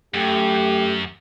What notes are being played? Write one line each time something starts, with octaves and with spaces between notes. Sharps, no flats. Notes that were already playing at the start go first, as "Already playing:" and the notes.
F#2 A3 G4